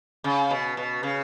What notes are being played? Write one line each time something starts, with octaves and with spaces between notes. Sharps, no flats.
C#3
B2
B2
C#3